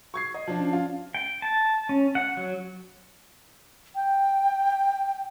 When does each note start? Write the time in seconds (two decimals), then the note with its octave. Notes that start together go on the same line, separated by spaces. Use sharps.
0.14 C#6 G#6 C7
0.34 D#5
0.47 F3 D4
0.59 C#4
0.73 F4
1.15 G5
1.42 A5
1.89 C#4
2.15 F#5
2.37 F#3
3.95 G5